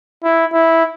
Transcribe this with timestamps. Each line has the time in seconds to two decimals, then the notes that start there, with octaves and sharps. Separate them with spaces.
0.24 E4
0.53 E4